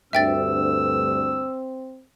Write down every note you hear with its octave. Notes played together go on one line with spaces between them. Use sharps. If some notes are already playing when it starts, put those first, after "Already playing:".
D2 G2 C4 E5 G5 E6 A6